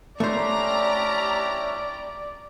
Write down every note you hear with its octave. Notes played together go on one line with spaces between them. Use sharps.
A3 C#4 D4 E4 G4 C5 D5 A#5